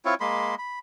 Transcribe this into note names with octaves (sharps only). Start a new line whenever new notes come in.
C4 E4 F4 C#5
G#3 A#3 B5 C6
B5